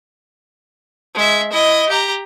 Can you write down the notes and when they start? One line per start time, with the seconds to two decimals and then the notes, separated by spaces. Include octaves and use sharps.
1.15 G#3 E5
1.52 E4 D#5
1.89 G4 A#5